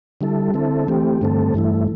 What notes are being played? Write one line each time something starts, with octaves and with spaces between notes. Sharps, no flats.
D3 G3 E4 A4
D3 C4 E4 A4
E3 A3 C4 G4
G2 D3 A3 C4 A4
G2 E3 A3 E4